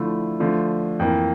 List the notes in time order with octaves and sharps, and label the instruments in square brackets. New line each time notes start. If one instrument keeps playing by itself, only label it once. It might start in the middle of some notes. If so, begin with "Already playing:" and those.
Already playing: [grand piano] D3 F3 A3 E4
D3 F3 A3
F2 E3 A#3